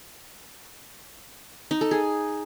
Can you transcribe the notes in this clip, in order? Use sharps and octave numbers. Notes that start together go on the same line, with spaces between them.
D#4
A4
G#4